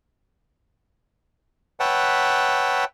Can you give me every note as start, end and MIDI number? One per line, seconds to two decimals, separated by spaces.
1.80 2.85 71
1.80 2.85 73
1.80 2.85 76
1.80 2.85 78
1.80 2.85 79
1.80 2.85 81